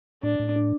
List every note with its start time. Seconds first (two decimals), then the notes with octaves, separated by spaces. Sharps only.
0.23 A2 D4
0.39 A2
0.56 D4